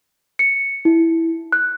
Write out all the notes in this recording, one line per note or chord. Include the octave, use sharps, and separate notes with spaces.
C#7
E4
F#6